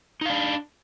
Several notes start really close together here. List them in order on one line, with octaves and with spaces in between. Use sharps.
D#4 F5 D4